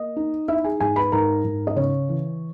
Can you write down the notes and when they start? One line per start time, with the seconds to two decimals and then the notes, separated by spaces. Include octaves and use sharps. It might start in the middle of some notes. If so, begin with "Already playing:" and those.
Already playing: A#3 D#5
0.16 D#4
0.48 D#4 E4 E5
0.64 G#4 G#5
0.80 G#2 G#4 G#5
0.96 B4 B5
1.12 G#2 A#4 A#5
1.44 G#2
1.67 D#5
1.76 C#3 C#5
2.09 E3